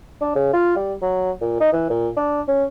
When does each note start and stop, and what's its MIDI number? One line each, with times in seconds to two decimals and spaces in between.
0.21 0.33 62
0.35 0.50 49
0.54 0.75 65
0.76 0.94 55
1.02 1.32 54
1.41 1.57 46
1.60 1.71 63
1.73 1.87 52
1.90 2.09 46
2.17 2.42 62
2.48 2.65 61